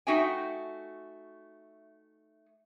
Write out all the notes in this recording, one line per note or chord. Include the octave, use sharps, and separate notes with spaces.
A3 D#4 F#4 E5 G5 G#5